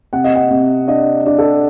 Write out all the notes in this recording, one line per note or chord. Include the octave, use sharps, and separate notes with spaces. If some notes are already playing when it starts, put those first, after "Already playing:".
C3 F#5
D#5
F#5
C3
D4 D#5
D4
A4